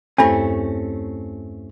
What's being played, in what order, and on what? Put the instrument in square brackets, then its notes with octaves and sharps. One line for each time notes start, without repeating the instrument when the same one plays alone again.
[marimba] E2 G2 [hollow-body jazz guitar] A3 C4 C#4